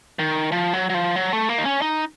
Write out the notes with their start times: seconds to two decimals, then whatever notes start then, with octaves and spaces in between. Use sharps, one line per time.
0.19 D#3
0.52 F3
0.73 F#3
0.90 F#3
0.94 F3
1.16 F#3
1.33 A3
1.49 A#3
1.58 D#4
1.65 C#4
1.82 D#4